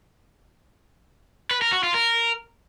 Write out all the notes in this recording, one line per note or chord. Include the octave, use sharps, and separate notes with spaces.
B4
A#4
F#4
F4
A#4